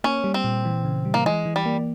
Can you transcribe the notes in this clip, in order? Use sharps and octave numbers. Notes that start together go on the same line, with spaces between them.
A#3 C#4
G3
C4
A#2
E3
C#3
G3
A#3
E3 G#3
E3
G3
A#3